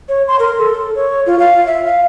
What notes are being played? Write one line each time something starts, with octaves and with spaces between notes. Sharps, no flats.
C#5
C6
A#4
A4
A4
C#5
F4
F5
E5
F5